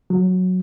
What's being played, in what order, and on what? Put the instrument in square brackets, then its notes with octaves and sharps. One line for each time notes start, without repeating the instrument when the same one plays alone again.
[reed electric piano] F#3